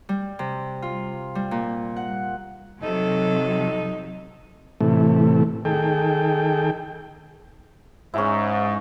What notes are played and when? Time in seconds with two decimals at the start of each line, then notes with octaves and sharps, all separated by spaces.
0.09 G3
0.39 C3
0.82 F4
1.35 G3
1.51 A#2
1.96 F#5
2.83 C3 F#3 D#4 A4
4.80 A2 C3 E3 A3
5.65 D#3 G#4 A4 G5
8.14 G#2 C#4 E4